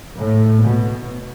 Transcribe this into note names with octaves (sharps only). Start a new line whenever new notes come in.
A2
B2